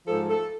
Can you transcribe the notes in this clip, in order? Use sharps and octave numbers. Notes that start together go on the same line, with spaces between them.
G#2 F3 A4
A4